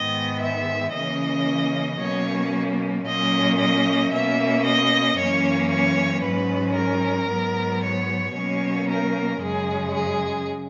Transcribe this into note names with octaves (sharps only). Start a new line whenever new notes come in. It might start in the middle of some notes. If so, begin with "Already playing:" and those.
Already playing: G#2 D#3 G#3 B3 D#5
E5
C#3 E3 A#3 C#4 D#5
B2 F#3 A#3 C#4 C#5
A#2 F#3 A#3 C#4 D#5
D#5
B2 A#3 C#4 E5
D#5
F#2 E3 A#3 C#4 C#5
C#5
G#2 F#3 C#4 B4
A#4
G#2 F#3 B3
C#5
B2 F#3 A#3 C#4 C#5
A#4
F#2 C#3 G#3 G#4
G#4